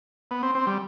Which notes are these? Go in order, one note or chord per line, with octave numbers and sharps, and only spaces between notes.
B3
C4
C4
G3